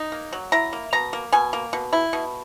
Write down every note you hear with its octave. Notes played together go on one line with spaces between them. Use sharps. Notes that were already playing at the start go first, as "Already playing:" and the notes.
Already playing: D#4
A#3
F#3
E4 A#5
A#3
B2 A#5
A#3
B2 G#5
A#3
B2
E4
B2